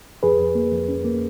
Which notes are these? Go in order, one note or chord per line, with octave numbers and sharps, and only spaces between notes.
F2 G#4 B4
F2
A#3
F2
C#4
A#3